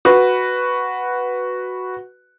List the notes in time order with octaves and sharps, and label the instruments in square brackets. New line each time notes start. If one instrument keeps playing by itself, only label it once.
[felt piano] F#4 B4